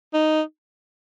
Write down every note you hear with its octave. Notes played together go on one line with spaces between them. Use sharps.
D#4